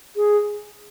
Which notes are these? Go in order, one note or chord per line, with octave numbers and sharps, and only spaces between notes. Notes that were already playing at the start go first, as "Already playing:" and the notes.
G#4